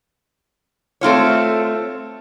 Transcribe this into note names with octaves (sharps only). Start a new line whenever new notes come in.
A3 C4 F4 C#5